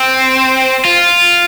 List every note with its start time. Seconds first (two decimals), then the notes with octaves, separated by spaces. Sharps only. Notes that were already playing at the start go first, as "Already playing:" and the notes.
Already playing: C4
0.85 F4